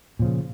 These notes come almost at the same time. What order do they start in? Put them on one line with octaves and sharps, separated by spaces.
A#2 F3 C#3